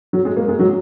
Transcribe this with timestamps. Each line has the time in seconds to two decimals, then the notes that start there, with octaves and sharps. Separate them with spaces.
0.13 F#3
0.25 G#3
0.36 A#3
0.48 G#3
0.59 F#3